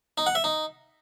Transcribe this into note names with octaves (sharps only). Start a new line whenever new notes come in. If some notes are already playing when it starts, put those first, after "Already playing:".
D#4
F#5
E5
D#4